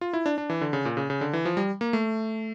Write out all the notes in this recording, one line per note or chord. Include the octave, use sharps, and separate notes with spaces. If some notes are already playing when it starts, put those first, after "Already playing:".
F4
E4
D4
D4
E3
D3
C#3
A#2
C#3
C#3
D3
E3
F3
G3
A#3
A3